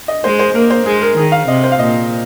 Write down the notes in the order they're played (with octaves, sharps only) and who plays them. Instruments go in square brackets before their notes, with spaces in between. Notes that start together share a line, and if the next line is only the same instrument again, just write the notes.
[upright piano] D#5
[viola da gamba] G#3 [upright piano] C5
[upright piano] C5
[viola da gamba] A#3 [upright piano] A#4
[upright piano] C5
[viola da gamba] G#3 [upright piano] G#4
[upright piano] A#4
[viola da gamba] D#3 [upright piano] G#4
[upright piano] F5
[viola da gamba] C3 [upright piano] D#5
[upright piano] C5
F5
[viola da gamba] A#2 [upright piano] D#5